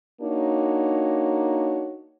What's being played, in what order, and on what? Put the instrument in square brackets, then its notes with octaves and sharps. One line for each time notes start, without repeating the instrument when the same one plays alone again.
[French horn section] A#3 D4 D#4 F#4 C#5